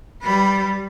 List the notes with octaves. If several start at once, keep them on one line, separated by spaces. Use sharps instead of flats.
G3 B4